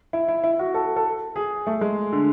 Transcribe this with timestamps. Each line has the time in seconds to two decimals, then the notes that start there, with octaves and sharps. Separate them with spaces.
0.13 E4
0.28 E4
0.44 E4
0.59 F#4
0.74 A4
0.96 A4
1.36 G#4
1.67 A3
1.81 G#3
2.13 D3